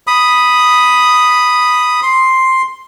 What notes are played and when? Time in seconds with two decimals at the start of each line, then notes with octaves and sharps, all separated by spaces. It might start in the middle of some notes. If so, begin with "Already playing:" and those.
0.07 B5 D#6
2.03 C6